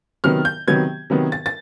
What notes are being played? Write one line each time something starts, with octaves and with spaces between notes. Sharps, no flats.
C3 D#3 F#3 B3 F6
G6
C3 D#3 F#3 B3 G#6
C3 D#3 F#3 B3
A6
A6